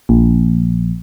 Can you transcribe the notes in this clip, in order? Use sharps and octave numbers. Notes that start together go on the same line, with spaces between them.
A#1